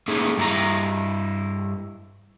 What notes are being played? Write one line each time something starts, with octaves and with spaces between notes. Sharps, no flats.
A3 A#3 C#4 D#4 G#4
G2 E4 A#5